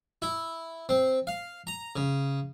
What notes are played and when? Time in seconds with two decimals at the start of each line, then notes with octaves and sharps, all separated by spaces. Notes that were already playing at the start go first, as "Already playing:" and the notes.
0.22 E4
0.89 C4
1.27 F5
1.67 A#5
1.96 C#3